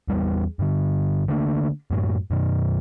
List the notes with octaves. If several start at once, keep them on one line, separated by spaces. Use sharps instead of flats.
E2 G3 G#3 B3
G2 D3
D3 A3 A#3 D4
F#2 A2 F#3
F#2 B2 D#3